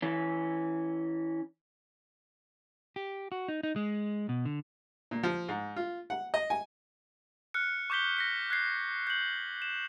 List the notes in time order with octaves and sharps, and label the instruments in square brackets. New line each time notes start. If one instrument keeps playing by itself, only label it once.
[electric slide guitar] E3 C#4
[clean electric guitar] G4
F#4
D#4
D#4
G#3
B2
D3
[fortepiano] A#2
F3
G#2
F4
F#5
D#5
G#5
[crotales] F6 F#6 C#7
C#6 D6 G6 B6 G7
A#6 B6 C#7
F#6 G#6 C7
G6 F#7
E7